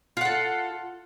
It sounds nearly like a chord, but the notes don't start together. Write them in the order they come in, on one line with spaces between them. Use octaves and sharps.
F4 F#5 A4